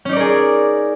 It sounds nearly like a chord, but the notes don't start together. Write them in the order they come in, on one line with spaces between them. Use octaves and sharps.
C#4 D#4 D5 A#4 G#4